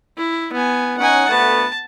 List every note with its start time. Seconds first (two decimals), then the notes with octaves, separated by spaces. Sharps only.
0.17 E4
0.52 B3 G#5
0.98 C#4 D#4 F#5 G#5
1.29 D2 A3 B3 A5